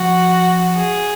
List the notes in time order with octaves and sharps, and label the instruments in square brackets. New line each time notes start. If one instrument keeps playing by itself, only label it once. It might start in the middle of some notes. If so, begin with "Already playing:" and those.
Already playing: [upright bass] F3 [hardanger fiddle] F#4
[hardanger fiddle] G#4